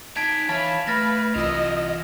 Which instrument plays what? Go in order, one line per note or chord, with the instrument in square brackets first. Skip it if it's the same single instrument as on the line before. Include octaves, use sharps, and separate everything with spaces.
[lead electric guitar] D#4 A5 [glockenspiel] G#6 B6 D7
[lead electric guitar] E3 E5 [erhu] C#5 [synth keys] F5 A5 B5
[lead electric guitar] A3 [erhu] B4 [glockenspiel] F6 A6 A#6
[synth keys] C2 E6 [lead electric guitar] E3 F4 [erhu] D#5